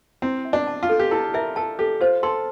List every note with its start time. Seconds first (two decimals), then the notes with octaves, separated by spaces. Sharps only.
0.22 C4 E4
0.45 E5
0.53 D4
0.67 A5
0.83 F4
0.89 A4
1.00 G4
1.11 E4 A4
1.34 A#4 E5
1.56 A4 A5
1.79 G4 A4
2.01 F4 C5
2.23 A4 C6